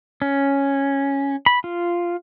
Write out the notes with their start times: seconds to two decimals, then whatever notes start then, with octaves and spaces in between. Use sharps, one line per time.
0.22 C#4
1.46 B5
1.64 F4